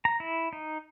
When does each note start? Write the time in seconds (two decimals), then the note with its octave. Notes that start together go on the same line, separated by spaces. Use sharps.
0.05 A#5
0.20 E4
0.53 D#4